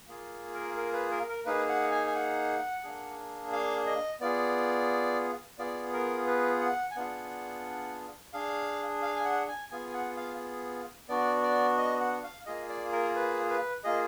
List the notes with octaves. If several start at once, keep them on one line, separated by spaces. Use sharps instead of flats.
A#3 F4 G#4
A#4
A#4
B4
A#4
A#4
A#3 D#4 G#4 B4
F#5
G#5
G#5
F#5
A#3 D4 G#4
F5
D#5
B3 F4 G#4 D5
B3 F4 G#4 D5
A#4
B4
F#5
G#5
B3 D4 F4 G#4 F#5
D4 G#4 F5
F5
G#5
F#5
G#5
B3 F4 G#4 G#5
G#5
F#5
F5
B3 D4 F#4 D5
D5
D#5
F#5
F5
A#3 F4 G#4 D#5
D5
A#4
B4
B4
A#3 F4 G#4 D#5